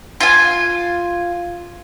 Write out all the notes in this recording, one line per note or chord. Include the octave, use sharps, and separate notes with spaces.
F4 G#5